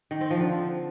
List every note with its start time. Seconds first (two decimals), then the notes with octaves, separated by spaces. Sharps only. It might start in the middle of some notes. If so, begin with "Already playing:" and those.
0.11 D#3
0.21 C4
0.30 F3
0.40 D3